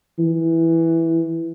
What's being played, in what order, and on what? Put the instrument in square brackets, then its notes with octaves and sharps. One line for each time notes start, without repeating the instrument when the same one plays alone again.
[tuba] E3